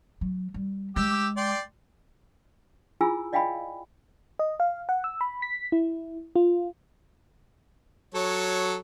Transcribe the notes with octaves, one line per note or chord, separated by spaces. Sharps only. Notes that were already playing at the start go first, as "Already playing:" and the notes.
F#3
G3
G#3 G4 D6 E6
D5 G5 C6
E4 F4 G#4 G#5 B5 E6
D5 D#5 F5 G5 G#5 B5
D#5
F5
F#5
E6
B5
B6
E4
F4
F#3 A4 C#5